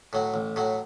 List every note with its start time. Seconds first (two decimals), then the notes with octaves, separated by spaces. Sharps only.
0.13 A2 F#3
0.34 A1
0.56 A2 F#3